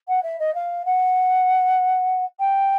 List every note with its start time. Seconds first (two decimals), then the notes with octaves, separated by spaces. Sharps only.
0.08 F#5
0.23 E5
0.39 D#5
0.55 F5
0.85 F#5
2.40 G5